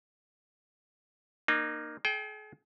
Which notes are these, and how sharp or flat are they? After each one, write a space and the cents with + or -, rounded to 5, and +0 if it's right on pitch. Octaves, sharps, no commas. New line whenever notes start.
A#3 +5 D#4 -35
G#4 +45 G5 +0